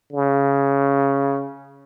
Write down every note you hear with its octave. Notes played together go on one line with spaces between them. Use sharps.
C#3